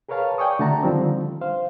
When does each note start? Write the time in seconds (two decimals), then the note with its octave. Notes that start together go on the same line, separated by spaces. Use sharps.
0.09 G#4 A#4 B4 C#5 F5 A5
0.38 D5 G5 G#5 C#6 D#6
0.59 D3 A3 F#4 A5 A#5
0.83 D3 D#3 F3 G3 C4
1.41 C5 F5